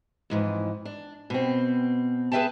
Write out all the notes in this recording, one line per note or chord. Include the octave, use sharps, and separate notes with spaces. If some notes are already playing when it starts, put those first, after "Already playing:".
F2 G#2 E3
D4
B2 C4
G#4 B4 D#5 E5 G5 A5